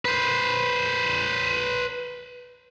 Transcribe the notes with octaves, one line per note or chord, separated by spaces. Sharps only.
B4 C5